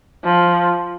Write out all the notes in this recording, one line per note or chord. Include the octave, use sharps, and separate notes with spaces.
F3